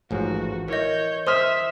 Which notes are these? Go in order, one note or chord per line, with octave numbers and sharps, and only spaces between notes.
A1 G#2 F3 F#4
E3 A#4 C#5 D#5 G6
C5 E5 C6 D#6 F6